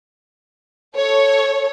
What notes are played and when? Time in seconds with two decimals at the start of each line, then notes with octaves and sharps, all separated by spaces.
0.97 A4 C#5